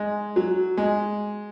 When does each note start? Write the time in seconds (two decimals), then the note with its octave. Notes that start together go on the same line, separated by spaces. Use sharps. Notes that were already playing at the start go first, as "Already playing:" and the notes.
Already playing: G#3
0.36 F#3
0.77 G#3